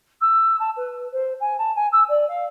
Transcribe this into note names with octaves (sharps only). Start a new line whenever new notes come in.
E6
A5
B4
C5
G#5
A5
G#5
E6
D5
F5